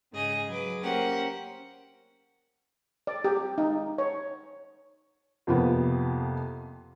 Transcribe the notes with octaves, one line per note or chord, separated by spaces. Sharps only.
G#2 C#3 G#4 D#5
F#3 G#4 B4 D6
A#3 C#4 G4 A#4 C5 F#5
D5
G4
D#4
C#5
F2 C3 F3 A#3 B3